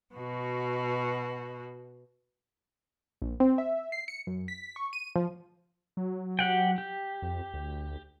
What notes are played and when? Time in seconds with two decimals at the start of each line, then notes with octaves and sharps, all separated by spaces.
0.15 B2 F#4
3.22 A#1
3.40 C4
3.58 E5
3.92 C7
4.08 C#7
4.27 F#2
4.48 B6
4.76 C#6
4.93 D#7
5.16 F3
5.97 F#3
6.39 G4 F#5 G5
6.78 G4
7.22 F2
7.54 D2